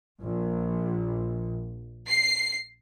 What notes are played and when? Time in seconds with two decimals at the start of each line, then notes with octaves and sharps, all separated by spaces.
0.20 A#1
2.08 C7